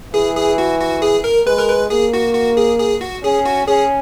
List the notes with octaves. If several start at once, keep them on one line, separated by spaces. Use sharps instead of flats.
E3 G#4
G#4
F#4
F#4
G#4
A#4
G#3 B4
A#4
B4
A#3 G#4
F#4
F#4
G#4
G#4
F#4
C#4 G#4
F#4
C#4 G#4